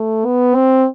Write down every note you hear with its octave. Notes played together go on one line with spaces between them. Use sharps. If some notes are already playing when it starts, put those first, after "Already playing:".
Already playing: A3
B3
C4